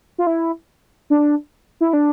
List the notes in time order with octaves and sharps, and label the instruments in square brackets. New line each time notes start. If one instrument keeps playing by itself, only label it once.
[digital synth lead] F4
E4
D4
E4
D4